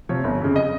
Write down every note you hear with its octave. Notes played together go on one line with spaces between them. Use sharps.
C3 F3 C#5
G1
F2 C#3
D#5